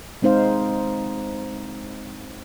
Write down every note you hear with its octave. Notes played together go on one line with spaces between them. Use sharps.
G#3 C4 D#4 C5 F5